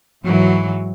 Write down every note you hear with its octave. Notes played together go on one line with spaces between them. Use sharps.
G#2 E3 F#3